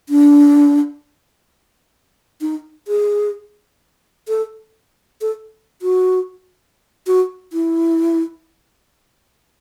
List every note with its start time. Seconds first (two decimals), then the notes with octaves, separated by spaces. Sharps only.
0.09 D4
2.41 D#4
2.88 G#4
4.28 A4
5.21 A4
5.82 F#4
7.07 F#4
7.53 E4